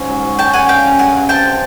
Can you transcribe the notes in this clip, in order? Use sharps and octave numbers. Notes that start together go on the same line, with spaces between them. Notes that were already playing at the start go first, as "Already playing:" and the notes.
Already playing: G#2 C#4
F#3
F#3
C#4 G5 A5
D3 F#5 G#5
C#3 F5 G5
C#3
G2 F#5 G#5
G2
C4 G5 A5
D3